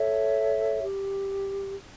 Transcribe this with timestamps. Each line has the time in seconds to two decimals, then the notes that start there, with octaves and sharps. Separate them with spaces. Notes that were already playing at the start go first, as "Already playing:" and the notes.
Already playing: A4 C#5 E5
0.83 G4